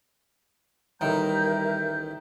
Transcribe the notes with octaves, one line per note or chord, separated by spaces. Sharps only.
A1 D#3 G3 A#4 E5 A#5 G6